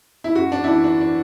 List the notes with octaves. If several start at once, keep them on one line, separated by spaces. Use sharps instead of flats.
E4
F#2 F#4
D4
E4
E3 D4
D4
D4